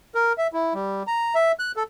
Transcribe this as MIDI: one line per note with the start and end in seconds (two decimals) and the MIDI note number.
0.15 0.33 70
0.38 0.47 76
0.53 0.74 64
0.74 1.03 55
1.07 1.35 82
1.35 1.52 76
1.59 1.72 90
1.76 1.83 69